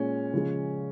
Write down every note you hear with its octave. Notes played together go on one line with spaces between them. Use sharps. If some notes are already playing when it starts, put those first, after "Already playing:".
Already playing: A#2 G#3 C#4
C#3 F3 G#3